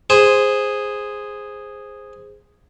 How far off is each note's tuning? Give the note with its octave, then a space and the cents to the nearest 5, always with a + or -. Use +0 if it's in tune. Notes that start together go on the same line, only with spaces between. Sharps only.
G#4 -5 C5 +0